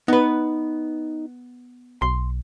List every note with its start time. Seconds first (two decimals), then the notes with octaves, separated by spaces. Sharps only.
0.08 B3 D#4 B4
2.02 B1 C6